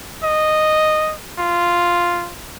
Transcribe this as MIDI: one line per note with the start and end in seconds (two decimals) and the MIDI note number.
0.23 1.14 75
1.39 2.34 65